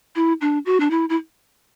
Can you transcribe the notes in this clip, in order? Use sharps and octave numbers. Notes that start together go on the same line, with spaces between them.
E4
D4
F#4
D4
E4
E4